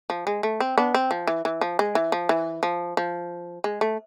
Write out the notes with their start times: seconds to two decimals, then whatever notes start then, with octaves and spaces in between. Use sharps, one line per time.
0.10 F3
0.27 G#3
0.43 A3
0.60 C4
0.78 B3 D4
0.94 C4
1.11 F3
1.28 E3
1.45 E3
1.61 F3
1.79 G#3
1.95 E3
2.12 F3
2.29 E3
2.63 F3
2.97 F3
3.64 G#3
3.81 A3